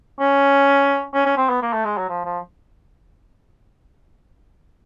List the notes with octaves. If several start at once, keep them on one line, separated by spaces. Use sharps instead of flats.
C#4
C#4
C#4
C4
B3
A#3
A3
G#3
F#3
F3
F3